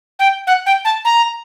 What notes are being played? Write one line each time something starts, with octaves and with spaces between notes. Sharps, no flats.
G5
F#5
G5
A5
A#5